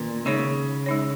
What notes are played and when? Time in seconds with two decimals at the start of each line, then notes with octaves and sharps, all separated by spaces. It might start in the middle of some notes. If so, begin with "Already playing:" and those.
Already playing: A#2 D#3 C#4
0.26 C#3 G#3 D#4 C#5
0.86 G#3 D#4 C#5